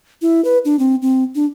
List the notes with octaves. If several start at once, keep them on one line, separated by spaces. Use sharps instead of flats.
E4
B4
D4
C4
C4
D4